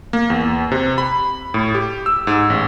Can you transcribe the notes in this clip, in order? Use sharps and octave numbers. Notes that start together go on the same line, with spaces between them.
A#3
E2
C3
B5
A2
G4
E6
G#2
A1